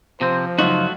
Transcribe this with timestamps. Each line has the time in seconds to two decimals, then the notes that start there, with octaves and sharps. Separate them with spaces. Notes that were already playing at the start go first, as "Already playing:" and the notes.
0.21 C3 F3 C4 C5
0.59 C#2 F#2 F#3 A3 D#4 F4 F#4